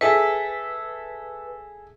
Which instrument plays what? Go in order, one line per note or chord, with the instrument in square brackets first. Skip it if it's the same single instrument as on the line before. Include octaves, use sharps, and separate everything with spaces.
[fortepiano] G#4 A4 E5 [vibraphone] B4